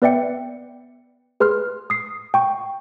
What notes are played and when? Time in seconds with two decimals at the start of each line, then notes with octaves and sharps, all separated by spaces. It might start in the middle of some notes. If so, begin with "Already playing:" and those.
0.02 B3 B4 D5 E5 G5 C#7
1.40 G#4 B4 C6 F6
1.90 D#6 C7
2.34 G5 C#6